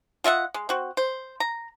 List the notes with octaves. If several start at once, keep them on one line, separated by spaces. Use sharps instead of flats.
F4 D#5 E5 F#5
G#3
C4 F#4
C5
A#5